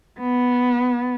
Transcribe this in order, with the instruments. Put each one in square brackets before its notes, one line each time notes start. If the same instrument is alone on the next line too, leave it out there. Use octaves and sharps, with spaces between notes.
[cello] B3